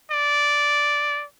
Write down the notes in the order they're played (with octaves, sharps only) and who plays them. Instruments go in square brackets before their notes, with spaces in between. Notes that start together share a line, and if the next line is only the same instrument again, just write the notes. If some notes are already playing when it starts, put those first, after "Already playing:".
[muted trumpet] D5